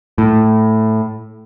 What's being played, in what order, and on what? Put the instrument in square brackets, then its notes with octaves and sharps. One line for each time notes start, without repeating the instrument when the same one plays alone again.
[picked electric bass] A2